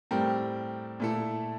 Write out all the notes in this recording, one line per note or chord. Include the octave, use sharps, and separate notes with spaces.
A2 G3 C4 G4 A#4
A#2 A3 E4 A4